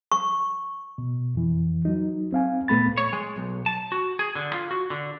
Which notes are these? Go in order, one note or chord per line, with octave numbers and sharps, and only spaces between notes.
C#6
B2
F2 E3
F#3 D#4
C4 F5 G#5
A#2 A3 B3 B5 A6
C#5
G#3
B1
A5
F#4
G#4
D3
F4
F#4
D3